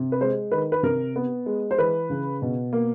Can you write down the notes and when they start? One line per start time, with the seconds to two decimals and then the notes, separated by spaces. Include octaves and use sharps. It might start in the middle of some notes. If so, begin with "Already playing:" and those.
Already playing: C3
0.12 B4
0.21 G#3 C5
0.51 D#3 B4
0.72 B4
0.83 C3 A#4
1.16 B3
1.46 G#3
1.71 C5
1.78 E3 B4
2.10 C#3
2.42 B2
2.73 A#3